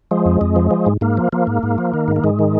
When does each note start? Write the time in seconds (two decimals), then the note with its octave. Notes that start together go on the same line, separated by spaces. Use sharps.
0.11 F3 G#3
0.26 F2
0.41 F2
0.56 F3
0.71 F3
0.86 G#2
1.01 G#2 A#3
1.17 F3
1.32 F3 A#3
1.47 G#2
1.63 G#2
1.78 F3
1.94 D#3
2.08 G#2
2.16 A#3
2.24 G#2 G#3
2.39 D#3